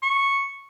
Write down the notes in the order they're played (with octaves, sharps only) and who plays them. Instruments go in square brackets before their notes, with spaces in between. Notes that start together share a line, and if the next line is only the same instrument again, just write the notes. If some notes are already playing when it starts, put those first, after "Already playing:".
[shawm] C#6